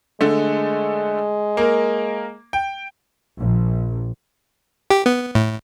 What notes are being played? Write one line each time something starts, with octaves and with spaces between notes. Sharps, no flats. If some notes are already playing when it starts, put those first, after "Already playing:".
D3 G#3 A3
A#3 A#4
G5
A#1
G4
B3
A2